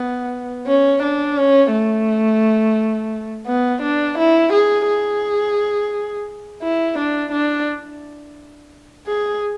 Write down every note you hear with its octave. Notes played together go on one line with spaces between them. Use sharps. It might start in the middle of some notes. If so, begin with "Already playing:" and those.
Already playing: B3
C#4
D4
C#4
A3
B3
D4
E4
G#4
G#4
E4
D4
D4
G#4